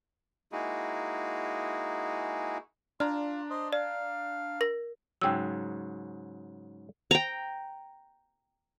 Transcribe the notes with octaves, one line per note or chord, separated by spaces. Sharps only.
G#3 A#3 D#4 E4 F#4 G#4
D4 F4 D5 A#5 F6
C5 D#5
D5 F5
A#4 A#6
G#2 C#3 F#3 G5 E6
G5 A#5